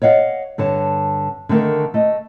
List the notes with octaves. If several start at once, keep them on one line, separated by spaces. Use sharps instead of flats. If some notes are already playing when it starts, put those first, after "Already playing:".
C#5 D#5 F5 F#5
G2 D3 C#5 A5
D3 D#3 A3 A#4
A3 D#5